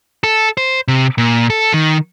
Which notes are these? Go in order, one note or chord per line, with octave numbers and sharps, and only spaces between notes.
A4
C5
C3
A#2
A4
D#3